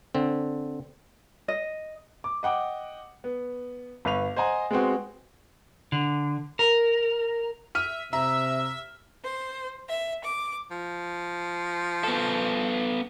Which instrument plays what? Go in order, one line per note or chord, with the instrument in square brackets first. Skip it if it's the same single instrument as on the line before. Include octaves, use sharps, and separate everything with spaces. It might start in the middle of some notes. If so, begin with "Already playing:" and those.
[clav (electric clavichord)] D3 C4
[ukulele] D#5
[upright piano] D6
D#5 F#5 G5 D6
B3
G1 B4 F7
C5 D#5 F#5 G#5 A#5
G#3 B3 C4 F#4
[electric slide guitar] D3
A#4
[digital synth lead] E5 [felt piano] F6 D#7
[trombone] C3 [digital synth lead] E5 [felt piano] A#5 [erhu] E6
[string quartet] C5
E5
D6
[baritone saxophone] F3
[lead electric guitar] B3 A4